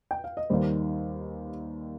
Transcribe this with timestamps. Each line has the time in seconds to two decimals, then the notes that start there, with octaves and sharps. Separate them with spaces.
0.11 G5
0.24 F5
0.37 D#5
0.50 D#2 D#3 G3 C5